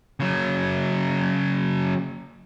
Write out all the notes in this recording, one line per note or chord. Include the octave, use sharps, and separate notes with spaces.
C#3 F#3